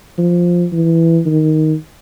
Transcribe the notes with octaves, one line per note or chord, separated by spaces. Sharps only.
F3
E3
D#3